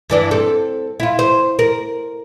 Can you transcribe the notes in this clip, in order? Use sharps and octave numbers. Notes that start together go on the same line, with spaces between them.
G2 E3 D4
C4 A4
E4 F4
C5
A#4